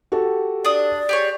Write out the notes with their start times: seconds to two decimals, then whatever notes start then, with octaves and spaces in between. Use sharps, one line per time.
0.12 F#4 G4 A4
0.65 D4 D5 D#6
1.09 G4 G#4 C#5